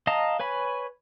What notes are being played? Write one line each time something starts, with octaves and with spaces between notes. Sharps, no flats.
D#5 F5 A5 A#5 D#6
B4 C#5 G#5 B5